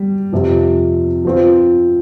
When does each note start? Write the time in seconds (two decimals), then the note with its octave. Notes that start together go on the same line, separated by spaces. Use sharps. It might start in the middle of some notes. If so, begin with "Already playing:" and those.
Already playing: G3
0.32 F2 C3 F3
1.25 F3 C4 F4